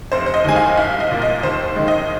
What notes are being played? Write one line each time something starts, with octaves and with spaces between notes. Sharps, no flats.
F1 C5
C5
D#5
D#2 D#3 G#3 G#5
F5
C2 F5
D#5
A#2 A#3
D#5
D#2 C5
D#3 G#3
D#5